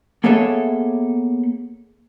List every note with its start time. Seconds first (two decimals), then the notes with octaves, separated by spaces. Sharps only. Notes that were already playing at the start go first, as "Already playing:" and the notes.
0.24 A#3 B3 G#4 A4 C#5 E5